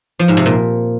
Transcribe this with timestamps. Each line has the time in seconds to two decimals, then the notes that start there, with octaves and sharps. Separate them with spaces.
0.19 F3
0.28 G#2
0.37 C3
0.46 A#2